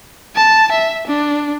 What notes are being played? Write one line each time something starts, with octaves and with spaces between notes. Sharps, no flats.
A5
E5
D4